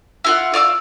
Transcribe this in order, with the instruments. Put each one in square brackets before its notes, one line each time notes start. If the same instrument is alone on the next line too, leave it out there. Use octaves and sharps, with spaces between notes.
[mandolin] E4 F4 F#5
D5 F5 D6 E6